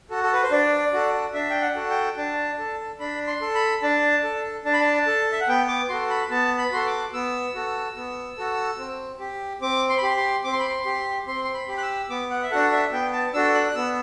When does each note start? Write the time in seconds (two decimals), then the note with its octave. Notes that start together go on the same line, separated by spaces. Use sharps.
0.10 F#4 A4
0.23 A4
0.33 B4
0.43 C5
0.51 D4 D5
0.93 F#4 A4
1.34 D4 E5
1.50 G5
1.62 F#5
1.76 F#4 A4
1.90 G5
2.17 D4 A5
2.58 A4
2.99 D4 B5
3.27 C6
3.41 A4
3.55 B5
3.82 D4 A5
4.24 A4
4.65 D4 A5
4.73 B5
4.81 A5
5.07 A4
5.32 E5
5.40 F#5
5.48 B3 G5
5.68 D6
5.89 F#4 A4 C6
6.10 B5
6.31 B3 A5
6.58 B5
6.72 F#4 A4 C6
6.86 D6
7.13 B3 E6
7.55 F#4 A4
7.97 B3
8.38 F#4 A4
8.79 C4
9.20 G4
9.62 C4 D6
9.89 C6
9.97 B5
10.03 G4 C6
10.17 C6
10.44 C4 D6
10.52 C6
10.60 B5
10.68 C6
10.85 G4
11.27 C4 C6
11.45 C6
11.54 B5
11.68 G4
11.78 F#6
11.82 E6
12.10 B3 D6
12.31 F#5
12.43 E5
12.51 D4 F#4 A4 F#5
12.72 E5
12.92 B3 G5
13.13 A5
13.34 D4 F#4 A4 E6
13.55 F#6
13.67 F#6
13.75 B3 E6